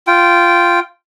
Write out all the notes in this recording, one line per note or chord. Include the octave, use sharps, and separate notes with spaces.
F4 G5